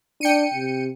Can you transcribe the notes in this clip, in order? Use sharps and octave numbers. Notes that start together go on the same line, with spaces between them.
D4 G5 C#7 D#7
C3